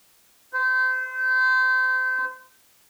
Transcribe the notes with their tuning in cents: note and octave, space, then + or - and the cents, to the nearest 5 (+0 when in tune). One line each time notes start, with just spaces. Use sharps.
C5 -30